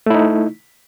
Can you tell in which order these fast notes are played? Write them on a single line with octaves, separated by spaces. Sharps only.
A3 E4 D#4